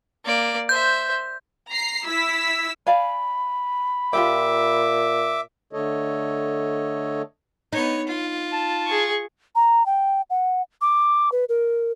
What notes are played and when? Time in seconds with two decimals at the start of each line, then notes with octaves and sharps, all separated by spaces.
0.25 A#3 D5
0.69 C5 E5 G6
1.70 A#5 C7
2.05 E4 E6 B6
2.87 D5 F5 G#5 B5
4.13 A#2 F4 G4 E5 G5 D6
5.73 D3 A3 A4 C#5 D#5
7.73 B3 D#4 C#5
8.07 F4
8.52 A5
8.86 G#4 C#6
9.55 A#5
9.86 G5
10.30 F#5
10.81 D6
11.32 B4
11.49 A#4